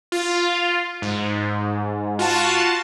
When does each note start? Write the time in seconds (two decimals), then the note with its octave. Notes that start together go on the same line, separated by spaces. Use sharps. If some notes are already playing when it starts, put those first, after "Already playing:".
0.12 F4
1.02 G#2
2.19 F4 F#4 A5